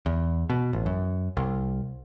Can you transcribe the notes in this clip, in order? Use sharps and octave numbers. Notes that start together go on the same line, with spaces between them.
E2
B2
A1
F#2
C2